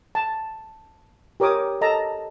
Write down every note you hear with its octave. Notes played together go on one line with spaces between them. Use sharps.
A5
G4 A#4 C#5 D6 D#6
A4 D#5 A5 A#5